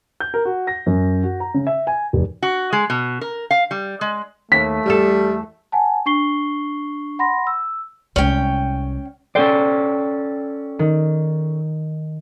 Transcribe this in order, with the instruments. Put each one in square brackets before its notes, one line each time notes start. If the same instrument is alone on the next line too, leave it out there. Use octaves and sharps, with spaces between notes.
[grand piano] G6
A#4
F#4
A#6
F#2
F#4
A#5
C#3
E5
G#5
F1
[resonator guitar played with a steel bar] F#4
G#3
B2
A#4
F5
G3
G#3
[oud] D#2 [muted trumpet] A3 [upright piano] B6
[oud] E2 A4 [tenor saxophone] G3
[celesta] F#5 G#5 A5
D4 C#6 C7 G7
F#5 B5 C6 A#6
E6
[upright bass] C2 G#3 [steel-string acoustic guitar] C#4 G5
[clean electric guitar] C#4 A4 D5 [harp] C5 G5
[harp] D#3